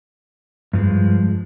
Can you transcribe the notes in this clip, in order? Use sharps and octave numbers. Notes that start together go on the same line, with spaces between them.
G2 F3 G#3